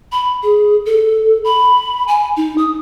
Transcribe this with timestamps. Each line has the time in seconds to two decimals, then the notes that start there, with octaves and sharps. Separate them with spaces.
0.12 B5
0.43 G#4
0.86 A4
1.44 B5
2.08 G#5
2.37 D#4
2.58 D#6